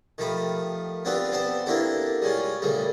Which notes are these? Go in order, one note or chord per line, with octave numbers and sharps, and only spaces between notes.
D#3 F3 A3 G4 B5
B3 C4 D4 F4 G4 B4
B3 C4 C5 D5 A5
A#3 C4 D4 E4 G4 A4
G3 G#3 C#4 F4
A#2 C#3 G3 A3